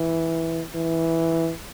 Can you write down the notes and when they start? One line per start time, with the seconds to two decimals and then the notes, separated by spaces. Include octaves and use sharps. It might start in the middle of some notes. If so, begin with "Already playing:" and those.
Already playing: E3
0.75 E3